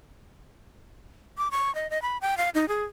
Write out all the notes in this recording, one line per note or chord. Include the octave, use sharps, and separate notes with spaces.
D6
C#6
D#5
D#5
B5
G5
F5
D#4
G#4